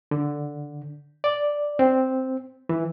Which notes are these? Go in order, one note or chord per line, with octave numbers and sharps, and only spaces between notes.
D3
D5
C4
E3